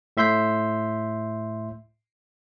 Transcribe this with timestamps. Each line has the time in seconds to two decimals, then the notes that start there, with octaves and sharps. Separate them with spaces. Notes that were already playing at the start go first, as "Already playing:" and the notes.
0.17 A2 E5 C6 G6 B6